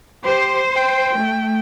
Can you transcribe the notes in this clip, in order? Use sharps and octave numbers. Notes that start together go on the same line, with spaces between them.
G4 C5
G5
A3